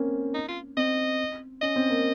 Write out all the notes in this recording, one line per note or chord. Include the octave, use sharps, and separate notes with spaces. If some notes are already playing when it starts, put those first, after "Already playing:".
Already playing: A#3 C4 C#4
D#4
F4
C4 D#5
C#4 D#5
C4
A#3